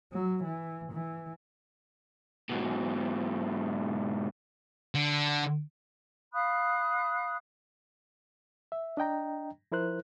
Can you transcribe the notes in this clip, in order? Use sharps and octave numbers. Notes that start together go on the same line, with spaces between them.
F#3
E3
E3
G#2 B2
D3
F5 B5 D#6 F#6
E5
D4 D#5 G5 A#5
F3 E4 A#4 C5 F#6